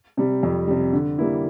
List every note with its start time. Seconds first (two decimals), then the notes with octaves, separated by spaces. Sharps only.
0.17 C3 G3
0.43 F2
0.68 C3 G3
0.93 D3
1.19 G3 A#3 E4